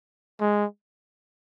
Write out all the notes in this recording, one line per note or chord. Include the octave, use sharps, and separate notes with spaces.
G#3